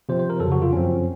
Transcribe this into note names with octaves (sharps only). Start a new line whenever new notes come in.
C3 F3 C4 C5
C5
A#4
F2 C#3 F#3 A4
F#4
F4
F#2 F3 C4 C#4